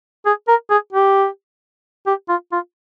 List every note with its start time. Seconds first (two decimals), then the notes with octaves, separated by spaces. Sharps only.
0.26 G#4
0.48 A#4
0.70 G#4
0.93 G4
2.07 G4
2.29 F4
2.52 F4